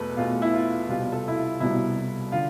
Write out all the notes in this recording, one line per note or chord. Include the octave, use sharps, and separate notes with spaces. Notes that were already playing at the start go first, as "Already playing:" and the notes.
Already playing: E2 B2 A3 A4 B4
E2 B2 A3 F4
E4
F4
C2 B2 G3 F4
A4
E4
F4
C2 B2 G3 E4
D3 F4